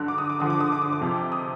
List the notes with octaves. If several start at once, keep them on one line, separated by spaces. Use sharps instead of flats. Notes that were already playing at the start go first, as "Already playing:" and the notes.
Already playing: G2 D3 F#3 F#6
D6
D#6
D6
G2 D3 F3 D#6
D6
D#6
D6
D#6
D6
F2 C3 F3
D#6